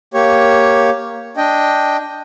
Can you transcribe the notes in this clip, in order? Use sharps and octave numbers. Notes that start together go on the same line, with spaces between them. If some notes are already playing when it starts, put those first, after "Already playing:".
A#3 G4 C#5
D4 D#5 G5